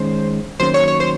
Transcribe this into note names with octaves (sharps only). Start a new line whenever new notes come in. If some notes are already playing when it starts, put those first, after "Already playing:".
Already playing: D#3 G#3 C#4 C5
D#3 F#3 A#3 C#4 C5
C#5
C#5
C5